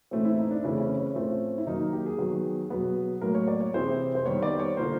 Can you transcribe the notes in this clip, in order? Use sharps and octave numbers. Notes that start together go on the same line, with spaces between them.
A2 E3 A3 C4 C#4
E4
D#4
D4
C#3 E3 A3 C4 C#4
C#4
C#4
A2 F3 A3 C4
E4
D#3 F#3 A#3 D#4
D#4
G4
G#4
D#3 F#3 B3
B2 F#3 B3
A2 F#3 A#3 A#4
C#5
D5
C#5
C3 E3 G#3 C5
C5
D#3 G3 B3 C#5
D5
C5
C#5
D3 F3 A#3 C5